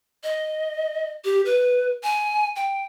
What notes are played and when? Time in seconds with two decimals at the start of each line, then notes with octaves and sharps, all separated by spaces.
0.24 D#5
1.25 G4
1.46 B4
2.03 G#5
2.56 G5